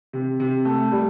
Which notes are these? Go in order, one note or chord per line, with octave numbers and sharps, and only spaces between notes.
C3
C3
A3
G3